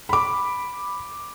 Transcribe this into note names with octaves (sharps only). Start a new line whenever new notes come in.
B5 D6